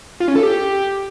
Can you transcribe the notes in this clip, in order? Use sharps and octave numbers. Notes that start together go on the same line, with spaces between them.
F4
C#4
A4
G4